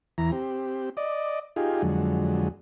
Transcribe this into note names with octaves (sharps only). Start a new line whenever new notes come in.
E2 E3 A#5
C4 G4
D5 D#5
D#4 F4 G4 G#4
F2 D3 F#3 G#3